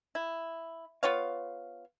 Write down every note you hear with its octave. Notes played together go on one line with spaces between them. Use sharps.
E4
B3 F4 C#5 F5